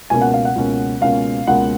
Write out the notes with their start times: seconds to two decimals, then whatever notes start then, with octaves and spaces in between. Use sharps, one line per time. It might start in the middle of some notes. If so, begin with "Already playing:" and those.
0.10 C#2 B2 A#3 C#4 G#5
0.21 F#5
0.34 F5
0.45 F#5
0.56 C#2 B2 A#3 C#4
1.01 C#2 B2 A#3 C#4 F5
1.47 C#2 B2 A#3 C#4 F#5